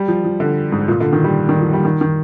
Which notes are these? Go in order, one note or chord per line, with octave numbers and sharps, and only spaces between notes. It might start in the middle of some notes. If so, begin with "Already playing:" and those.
Already playing: G3
F3
F3
D3
G#2
A#2
D3
D#3
G3
D#3
F3
G3
D#3
D#3